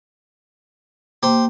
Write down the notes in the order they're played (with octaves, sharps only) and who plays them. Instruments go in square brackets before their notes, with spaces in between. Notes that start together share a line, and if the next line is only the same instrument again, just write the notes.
[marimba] A#3 [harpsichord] G4 C5